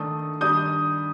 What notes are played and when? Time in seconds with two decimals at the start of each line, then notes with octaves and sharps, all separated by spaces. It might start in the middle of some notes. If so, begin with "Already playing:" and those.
Already playing: D#3 A3 D4 D#6
0.41 D#3 G3 D4 D#6 G6